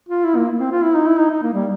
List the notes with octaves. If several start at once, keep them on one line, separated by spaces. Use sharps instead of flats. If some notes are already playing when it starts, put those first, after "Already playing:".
F4
E4
A#3
C4
F4
E4
D#4
E4
D#4
D#4
A#3
G3